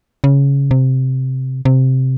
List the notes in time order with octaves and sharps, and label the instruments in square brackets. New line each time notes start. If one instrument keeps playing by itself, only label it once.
[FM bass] C#3
C3
C3